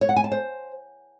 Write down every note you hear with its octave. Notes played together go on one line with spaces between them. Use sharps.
C#5
F#5
G#5
A5
C5